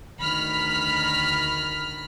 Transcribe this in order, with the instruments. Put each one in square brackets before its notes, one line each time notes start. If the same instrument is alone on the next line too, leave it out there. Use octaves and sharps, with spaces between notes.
[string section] D2 D#3 B5 F6 B6